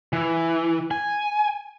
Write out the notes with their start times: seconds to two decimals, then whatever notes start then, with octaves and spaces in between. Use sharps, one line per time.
0.13 E3
0.91 G#5